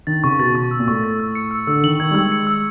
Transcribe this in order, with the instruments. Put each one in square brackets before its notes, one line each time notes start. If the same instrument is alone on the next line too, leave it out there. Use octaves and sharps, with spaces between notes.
[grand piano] D#3 [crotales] A6
[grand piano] C#3 [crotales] C#6
[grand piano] B2 [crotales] A6
[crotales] C#6
E6
[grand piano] A#2
[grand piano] A2 [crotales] C#6
[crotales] A6
E6
C#7
E6
[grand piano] D3 [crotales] E6
[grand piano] D#3 [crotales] F#7
[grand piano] D#3 [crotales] G#6
[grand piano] G3
[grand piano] G#3 [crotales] E6
[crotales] C#7
E6